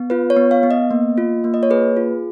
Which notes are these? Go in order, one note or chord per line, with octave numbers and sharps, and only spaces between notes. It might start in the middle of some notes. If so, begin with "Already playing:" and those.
Already playing: B3
F4 B4
C#5
B3
F5
B3
D#5
A#3
F4
A#3
D#5
C#5
G#4 B4
F4